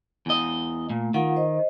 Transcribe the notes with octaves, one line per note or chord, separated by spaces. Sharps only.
E2 D#5
A#2 A3
D#3 F4 F5 F#5
C5 D#5